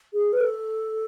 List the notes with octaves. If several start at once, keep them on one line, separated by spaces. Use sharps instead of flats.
G#4
B4
A4